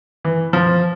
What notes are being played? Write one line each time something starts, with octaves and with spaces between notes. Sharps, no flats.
E3
F3